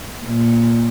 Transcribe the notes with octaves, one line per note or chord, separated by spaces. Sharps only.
A#2